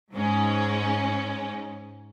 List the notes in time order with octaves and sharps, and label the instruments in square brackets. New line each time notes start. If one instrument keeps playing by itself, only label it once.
[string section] G#2 C#4